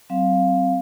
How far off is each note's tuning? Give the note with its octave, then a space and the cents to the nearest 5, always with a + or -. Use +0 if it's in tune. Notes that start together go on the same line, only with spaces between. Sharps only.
F#3 +35 C4 +0 F5 +0